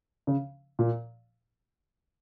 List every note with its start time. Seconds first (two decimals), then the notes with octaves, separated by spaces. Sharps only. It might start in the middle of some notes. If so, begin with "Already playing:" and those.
0.27 C#3
0.79 A#2